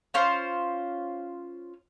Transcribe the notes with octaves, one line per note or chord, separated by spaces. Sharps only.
C#4 F4 C5